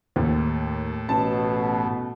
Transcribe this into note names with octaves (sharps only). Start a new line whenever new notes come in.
D#2 A2
A1 B2 A5